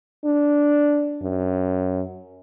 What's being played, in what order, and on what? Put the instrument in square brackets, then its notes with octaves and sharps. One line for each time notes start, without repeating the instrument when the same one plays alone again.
[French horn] D4
F#2